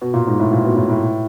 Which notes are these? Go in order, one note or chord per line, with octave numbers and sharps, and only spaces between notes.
B2
A#2
G#2
A2
A#2
B2
A2
A2